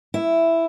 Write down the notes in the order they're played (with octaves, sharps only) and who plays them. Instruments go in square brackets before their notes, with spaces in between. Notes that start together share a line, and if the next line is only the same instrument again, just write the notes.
[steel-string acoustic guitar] E4